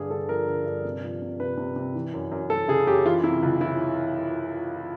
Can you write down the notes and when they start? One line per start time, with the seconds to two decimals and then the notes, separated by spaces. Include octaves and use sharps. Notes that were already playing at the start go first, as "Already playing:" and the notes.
Already playing: G2 D3 G#4
0.10 D3 A4
0.29 F3 A#4
0.47 D3
0.66 G2
0.84 C3
1.04 F3
1.22 C3
1.40 C3 B4
1.58 C3
1.76 C3
1.95 E3
2.14 F#2
2.31 F#2
2.49 F#2 A4
2.68 C#3 G#4
2.87 F#2 G4
3.05 E3 F4
3.23 C3 E4
3.43 C#2
3.60 E3 E4